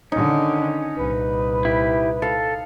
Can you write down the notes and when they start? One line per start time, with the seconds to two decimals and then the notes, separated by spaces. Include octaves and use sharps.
0.12 D3 D#3 C#4 D#4
0.96 C2 A#2 B4
1.65 E4 G4
2.22 A4 F5